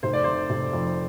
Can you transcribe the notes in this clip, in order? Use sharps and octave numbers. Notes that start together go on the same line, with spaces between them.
F1 C5
D5
C3 C5
F1
F2